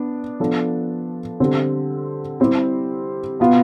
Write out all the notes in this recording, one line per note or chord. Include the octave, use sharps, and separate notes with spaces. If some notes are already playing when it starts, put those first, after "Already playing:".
Already playing: B3 D4
F3 B3 D4 A4
D3 G3 C4
G3 C4 E4 G4
B2 B3 F4